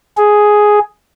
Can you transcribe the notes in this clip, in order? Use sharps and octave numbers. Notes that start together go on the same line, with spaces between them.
G#4